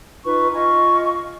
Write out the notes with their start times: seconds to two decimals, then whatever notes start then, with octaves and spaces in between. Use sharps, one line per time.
0.25 D#4 F4 B4 C#6
0.54 F4 D#5 G#5 C#6